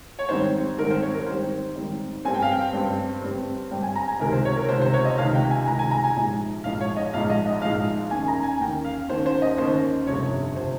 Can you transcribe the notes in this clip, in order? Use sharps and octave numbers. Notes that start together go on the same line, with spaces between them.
C#5
G#2 D#3 G3 C4 C5
G#2 D#3 G3 C4 A#4
C5
C#5
A#4
G#2 D#3 G3 C4 C5
G#2 D#3 G3 C4
G2 G3 C4 G#5
G5
F5
G5
G2 G3 C4
G2 G3 C4
G2 G3 C4 G5
G#5
A#5
G#5
C#2 C3 D#3 A#4
C5
C#5
A#4
C#2 C3 D#3 C5
C5
C#5
D#5
C#2 C3 D#3 F5
G5
G#5
C#2 C3 D#3 A#5
G#5
A#5
G#5
A#1 G#2 F3 G#3
A#1 G#2 F3 G#3 F5
C#5
D#5
A#1 G#2 F3 G#3 F5
D#5
D#5
A#1 G#2 F3 G#3 F5
D#2 D#3 A#3 C#4 G#5
A#5
G#5
D#2 D#3 A#3 C#4 G5
F5
D#2 D#3 A#3 C#4 C5
C5
D#5
D#2 D#3 A#3 C#4 C5
G1 F2 C3 F3 C#5
C3 F3 C5